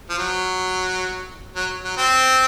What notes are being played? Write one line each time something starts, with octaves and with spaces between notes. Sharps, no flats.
F3
F#3
F#3
F#3
C4